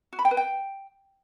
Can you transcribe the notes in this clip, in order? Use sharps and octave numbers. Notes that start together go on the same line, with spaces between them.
F#4
B5
G5
B4
G5